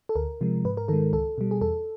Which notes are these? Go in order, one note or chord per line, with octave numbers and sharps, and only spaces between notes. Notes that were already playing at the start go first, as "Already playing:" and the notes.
A4
D2 A#4
C3 F3 G#3
G#2 B4
A#4
D#3 G#3 A4
C#2 A4
B2 G3
G#4
E2 A4